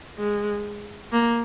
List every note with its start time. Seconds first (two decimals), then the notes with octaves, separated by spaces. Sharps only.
0.19 G#3
1.13 A#3